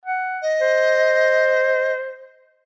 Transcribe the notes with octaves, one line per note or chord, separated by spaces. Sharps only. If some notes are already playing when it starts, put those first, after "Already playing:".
F#5
D#5
C5